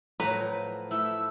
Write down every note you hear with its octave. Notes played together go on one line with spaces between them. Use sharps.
A2 F3 F#3 B4 A#5
A3 E4 E6